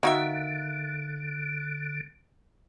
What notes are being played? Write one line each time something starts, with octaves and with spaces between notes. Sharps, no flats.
D3 D#3 A#3 D#4 F#4 E5